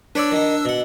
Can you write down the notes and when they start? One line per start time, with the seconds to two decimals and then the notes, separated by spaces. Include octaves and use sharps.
0.15 D4 B4 C#5 D5 E6
0.32 D#3 D#4
0.65 B2 F#5